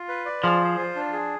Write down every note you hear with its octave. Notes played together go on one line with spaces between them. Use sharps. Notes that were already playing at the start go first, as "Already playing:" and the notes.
Already playing: F4
B4
D5
F3 G#4
C5
F4
D4
G#4